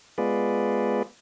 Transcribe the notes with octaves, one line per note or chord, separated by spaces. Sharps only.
G#3 B3 F4 G#4 B4 D5